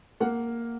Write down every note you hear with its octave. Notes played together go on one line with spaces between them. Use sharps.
A#3 F#5